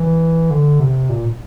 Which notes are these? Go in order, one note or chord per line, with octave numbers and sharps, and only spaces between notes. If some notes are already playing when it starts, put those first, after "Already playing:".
Already playing: E3
D3
C3
A#2